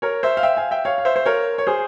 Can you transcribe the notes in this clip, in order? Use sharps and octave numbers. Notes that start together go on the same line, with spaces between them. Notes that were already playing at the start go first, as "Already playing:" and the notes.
A#4 C#5
C5 E5
F5
E5 G5
F5 G#5
E5 G5
C#5 F5
F5
C5 E5
C5
A#4 C#5
C#5
G#4 C5